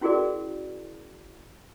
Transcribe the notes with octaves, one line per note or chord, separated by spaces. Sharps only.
C#4 E4 F#4 G#4 A#4 D5